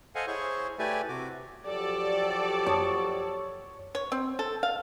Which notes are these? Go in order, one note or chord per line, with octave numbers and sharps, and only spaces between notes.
A4 C5 D#5 F5 F#5 G#5
E4 G#4 C5 C#5 C#6
A3 E4 G4 B4 D5 G#5
C3 F#4 D6
F3 F#3 G4 A4 D5
F#2 C#5 A5 D#6
C#5
C4
A4
F5